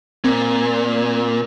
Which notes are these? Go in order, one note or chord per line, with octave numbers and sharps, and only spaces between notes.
A#2 C4